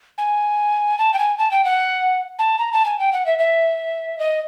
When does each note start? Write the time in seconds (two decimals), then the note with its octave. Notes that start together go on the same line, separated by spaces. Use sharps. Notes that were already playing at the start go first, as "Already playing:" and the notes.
0.18 G#5
0.99 A5
1.14 G5
1.19 G#5
1.38 A5
1.51 G5
1.64 F#5
2.39 A5
2.59 A#5
2.73 A5
2.86 G#5
2.99 G5
3.13 F#5
3.26 E5
3.39 E5
4.19 D#5